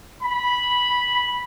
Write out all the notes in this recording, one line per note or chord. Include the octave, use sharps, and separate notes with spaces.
B5